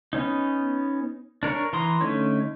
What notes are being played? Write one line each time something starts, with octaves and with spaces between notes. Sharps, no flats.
B3 C#4 D#4
D4 A#4 C#5
E3 A#5 C6 D#6
D3 A3 C#4 D#4 C#5